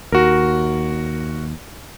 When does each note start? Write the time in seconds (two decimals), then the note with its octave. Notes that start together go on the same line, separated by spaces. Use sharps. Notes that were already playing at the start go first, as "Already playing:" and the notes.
0.12 D#2 F#4 A#4